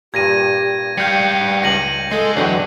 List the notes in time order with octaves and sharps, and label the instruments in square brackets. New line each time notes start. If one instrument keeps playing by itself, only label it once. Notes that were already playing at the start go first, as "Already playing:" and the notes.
[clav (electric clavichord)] G2 A#2 [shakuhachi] G4 [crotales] G#6 A#6 D#7
[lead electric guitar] G3 F5 [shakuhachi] G5 [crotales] G6 C#7
[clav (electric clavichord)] C#2 [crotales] A#6 D#7 F#7
[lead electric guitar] G#3 [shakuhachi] A4
[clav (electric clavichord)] E2 D3 G5 [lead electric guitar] F#3 [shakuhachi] D4